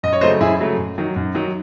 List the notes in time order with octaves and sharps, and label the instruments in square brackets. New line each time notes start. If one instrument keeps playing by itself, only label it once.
[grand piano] F#2 D#5
C#5
C#3 F#3 A3 C5 D#5
F#2 E4 G#4
C#3 F#3 A3
F#2
D#3 F#3
F#2
D#3 F#3